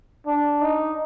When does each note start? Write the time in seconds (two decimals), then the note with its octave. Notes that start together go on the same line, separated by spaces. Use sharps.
0.26 D4
0.61 D#4